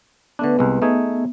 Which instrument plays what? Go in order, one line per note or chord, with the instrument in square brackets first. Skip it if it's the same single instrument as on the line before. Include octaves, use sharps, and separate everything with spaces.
[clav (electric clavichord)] D3 A3 D4 [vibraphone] B3 B4
[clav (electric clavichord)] C2 G#3
[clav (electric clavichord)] A3 D#4 G#4 [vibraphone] B3